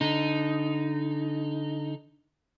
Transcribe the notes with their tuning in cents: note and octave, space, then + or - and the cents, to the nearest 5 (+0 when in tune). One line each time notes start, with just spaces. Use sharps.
D3 -15 D#4 +0